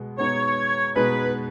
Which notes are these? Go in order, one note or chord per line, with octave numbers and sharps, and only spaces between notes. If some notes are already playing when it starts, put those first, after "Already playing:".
Already playing: B2 G#3 B3
B2 G#3 B3 D#4 C#5
B2 G#3 B3 D#4 B4